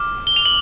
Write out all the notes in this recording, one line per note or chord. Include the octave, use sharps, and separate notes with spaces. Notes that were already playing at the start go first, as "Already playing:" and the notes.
Already playing: D6 F6
G7
F7
F#7